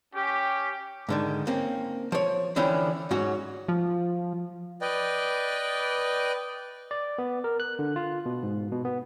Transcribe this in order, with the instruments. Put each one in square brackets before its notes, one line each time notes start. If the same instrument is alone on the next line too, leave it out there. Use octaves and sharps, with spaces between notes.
[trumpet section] C#4 G4
[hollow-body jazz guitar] G#2 D3 D#3
A#3 C4 C#4
F3 C#5
D3 E3 F3 C#4 E4 G5
G#2 F#3 C#4 F#4
[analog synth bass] F3
[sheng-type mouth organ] B4 D5 D#5 G5
[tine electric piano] D5
B3
A#4
F#6
D3
F4
B2
G#2
B2
B3